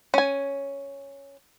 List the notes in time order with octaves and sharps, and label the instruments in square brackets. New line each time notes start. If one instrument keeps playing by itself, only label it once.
[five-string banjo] C#4 G#5